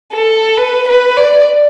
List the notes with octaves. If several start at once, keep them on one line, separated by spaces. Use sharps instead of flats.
A4
B4
B4
D5